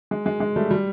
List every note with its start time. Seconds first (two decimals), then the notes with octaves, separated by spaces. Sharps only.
0.11 G#3
0.26 G#3
0.40 G#3
0.56 G3 A3
0.71 G3